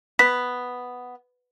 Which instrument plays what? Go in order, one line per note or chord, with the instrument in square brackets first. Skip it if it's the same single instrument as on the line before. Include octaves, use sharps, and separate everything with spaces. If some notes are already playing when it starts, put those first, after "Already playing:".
[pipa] B3 [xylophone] B6